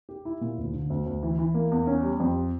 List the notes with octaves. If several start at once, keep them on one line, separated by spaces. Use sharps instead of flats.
G4
E4
A#2
D2
D3
D2
D2
E3
E3
A#3
E2
C#4
G3
F2